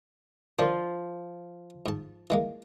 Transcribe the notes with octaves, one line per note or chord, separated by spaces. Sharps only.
F3 D4 F4 A#4
G#2 A5
E3 G#3 A#3